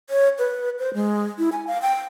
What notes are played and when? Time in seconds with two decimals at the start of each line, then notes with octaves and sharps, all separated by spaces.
0.10 C#5
0.39 B4
0.79 C5
0.94 G#3
1.39 E4
1.52 G#5
1.67 F5
1.82 G5